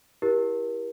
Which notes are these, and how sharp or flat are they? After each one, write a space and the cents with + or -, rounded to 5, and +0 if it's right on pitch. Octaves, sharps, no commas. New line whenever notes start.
E4 +0 G4 +0 A#4 +30